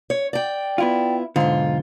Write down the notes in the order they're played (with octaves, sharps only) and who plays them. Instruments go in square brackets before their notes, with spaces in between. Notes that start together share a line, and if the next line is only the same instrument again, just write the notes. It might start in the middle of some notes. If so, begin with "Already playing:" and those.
[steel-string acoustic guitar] C#5
D5 G5
[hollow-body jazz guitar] B3 E4 F4
[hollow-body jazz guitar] B1 D3 [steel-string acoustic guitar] G#2 F4